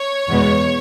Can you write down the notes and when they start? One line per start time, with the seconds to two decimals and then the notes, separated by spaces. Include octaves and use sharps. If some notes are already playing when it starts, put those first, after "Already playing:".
Already playing: C#5
0.29 E2 B2 G#3 B3